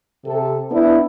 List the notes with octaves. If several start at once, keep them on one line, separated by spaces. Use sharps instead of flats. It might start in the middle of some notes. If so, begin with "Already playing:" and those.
C3 A4
B3 D4 E4